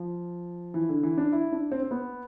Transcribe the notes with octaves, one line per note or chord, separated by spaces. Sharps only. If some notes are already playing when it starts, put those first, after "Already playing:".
Already playing: F3
E3
D3
E3
D4
E4
D4
C4
C4
B3